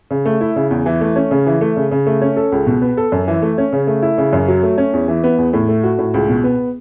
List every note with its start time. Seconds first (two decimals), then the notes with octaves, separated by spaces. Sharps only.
0.11 C#3
0.26 A3
0.41 E4
0.56 C#3
0.71 E2
0.86 E3
1.01 A3
1.16 C#4
1.31 C#3
1.46 E3
1.61 A3
1.76 C#3
1.92 C#3
2.07 A3
2.22 C#4
2.37 A4
2.52 C#2
2.67 B2
2.82 B3
2.97 A4
3.12 F#2
3.28 E3
3.42 A3
3.58 C#4
3.73 C#3
3.87 A3
4.02 E4
4.18 C#3
4.33 F#2
4.48 F#3
4.63 A3
4.78 C#4
4.93 E2
5.08 E3
5.24 B3
5.38 E2
5.53 A2
5.69 A3
5.84 F#4
5.99 A2
6.14 C#2
6.29 B2
6.44 B3